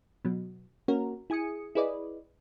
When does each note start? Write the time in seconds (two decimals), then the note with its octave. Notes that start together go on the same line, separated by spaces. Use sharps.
0.25 B2 F#3
0.88 A#3 C#4 F#4 A#4
1.30 E4 G#4 G#5 D#6 C#7
1.75 E4 G#4 B4 D5 D#5